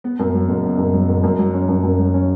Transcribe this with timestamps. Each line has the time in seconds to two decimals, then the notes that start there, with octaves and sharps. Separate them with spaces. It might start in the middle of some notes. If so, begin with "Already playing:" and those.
0.04 B3
0.19 F#2
0.34 F#3
0.49 F#1
0.64 B3
0.78 F#2
0.93 F#3
1.08 F#1
1.23 F#2
1.39 F#3
1.54 C#4
1.69 F#2
1.84 F#2
1.99 F#3
2.14 C#4